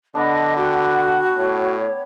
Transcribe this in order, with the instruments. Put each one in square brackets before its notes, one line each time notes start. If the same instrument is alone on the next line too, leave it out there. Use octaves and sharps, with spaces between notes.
[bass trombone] D3 [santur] B3 D4 [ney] D#5
[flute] F#4 [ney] F#5 [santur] G5 D6
[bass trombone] A2 [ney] C#5